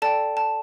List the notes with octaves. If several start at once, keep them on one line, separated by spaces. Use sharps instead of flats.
A4 D5 G5 A5
A5